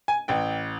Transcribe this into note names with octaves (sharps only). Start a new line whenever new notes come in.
G#5
A1 G5